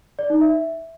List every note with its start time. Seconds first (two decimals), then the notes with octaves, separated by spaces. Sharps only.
0.19 D5
0.30 D#4
0.41 E5